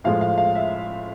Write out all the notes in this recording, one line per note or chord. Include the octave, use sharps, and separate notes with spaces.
A2 F3 G#3 F5
F5
F5
E5